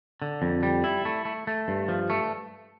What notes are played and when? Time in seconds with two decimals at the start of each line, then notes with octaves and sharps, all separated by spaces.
0.22 D3
0.42 F2
0.63 G3
0.84 E4
1.05 A3
1.25 A3
1.47 A3
1.68 G2
1.88 F3
2.10 A3